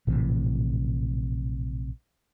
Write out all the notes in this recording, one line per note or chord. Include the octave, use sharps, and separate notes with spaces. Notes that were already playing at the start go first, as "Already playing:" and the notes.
A#1 A2 C3 E3